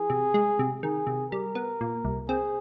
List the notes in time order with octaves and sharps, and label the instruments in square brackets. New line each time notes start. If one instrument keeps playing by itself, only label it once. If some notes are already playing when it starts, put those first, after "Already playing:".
Already playing: [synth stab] E3 [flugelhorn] G#4
[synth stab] C3
G#3
C3
[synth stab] D#3 [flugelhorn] G#4
[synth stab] C3
[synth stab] G3 [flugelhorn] A#4
[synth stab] B3
A#2
C2
[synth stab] C4 [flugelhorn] G#4